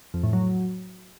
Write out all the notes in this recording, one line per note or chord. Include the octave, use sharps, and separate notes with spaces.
F2
A2
F#3